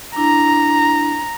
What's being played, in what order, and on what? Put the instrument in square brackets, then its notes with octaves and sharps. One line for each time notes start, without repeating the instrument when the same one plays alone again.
[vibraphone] D4 E4 [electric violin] A#5